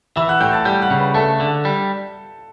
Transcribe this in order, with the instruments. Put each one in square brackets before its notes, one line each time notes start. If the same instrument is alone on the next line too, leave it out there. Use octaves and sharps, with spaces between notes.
[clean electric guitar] E3 [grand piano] E5 E6
[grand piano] F#5 F#6
[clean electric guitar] A2 [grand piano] G5 G6
[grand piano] A5 A6
[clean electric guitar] G3 [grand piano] G5 G6
[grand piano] F#5 F#6
[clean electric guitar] C#3
[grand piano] B4 B5
[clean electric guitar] A3 [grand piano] A4 A5
[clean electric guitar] D3
G3